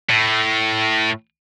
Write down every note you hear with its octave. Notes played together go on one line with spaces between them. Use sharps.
A2